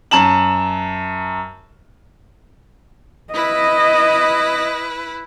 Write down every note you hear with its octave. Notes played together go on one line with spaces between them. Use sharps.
F#2 A5 E7 F#7
E4 B4 D#5